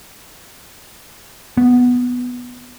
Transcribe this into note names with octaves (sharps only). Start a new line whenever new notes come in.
B3